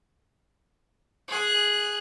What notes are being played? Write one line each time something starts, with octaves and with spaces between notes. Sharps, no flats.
G#4 F#6